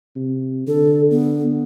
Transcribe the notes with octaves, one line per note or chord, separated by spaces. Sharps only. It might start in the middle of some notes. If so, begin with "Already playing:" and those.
C3
D3 A4
B3